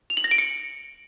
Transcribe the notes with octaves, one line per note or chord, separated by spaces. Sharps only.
F7
F#7
A#6
D7
C#7